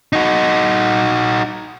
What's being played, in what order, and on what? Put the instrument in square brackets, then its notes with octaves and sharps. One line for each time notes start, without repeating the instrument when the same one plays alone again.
[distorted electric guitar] D#4 F#4